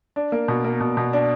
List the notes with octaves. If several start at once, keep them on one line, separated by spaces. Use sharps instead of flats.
D4
A#3
B2
A#3
B2
B2
D4